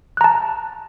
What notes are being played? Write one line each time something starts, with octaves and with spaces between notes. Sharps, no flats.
A5 A#5 F#6